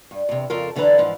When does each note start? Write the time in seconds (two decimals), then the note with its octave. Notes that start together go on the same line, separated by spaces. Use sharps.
0.11 G2
0.29 E2 C3
0.50 F2 C#3 F4 A4 A#4
0.76 F#2 D3 E3 D4 B4 A#5
0.98 G#2 E3 F3